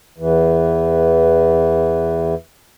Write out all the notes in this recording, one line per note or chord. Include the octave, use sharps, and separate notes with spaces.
E2 E3